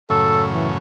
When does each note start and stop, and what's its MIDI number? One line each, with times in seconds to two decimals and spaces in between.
0.10 0.78 42
0.10 0.78 45
0.10 0.78 49
0.10 0.44 69
0.52 0.70 52